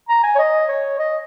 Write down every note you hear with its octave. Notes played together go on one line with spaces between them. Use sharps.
A#5
G#5
C#5
D#5
C#5
D#5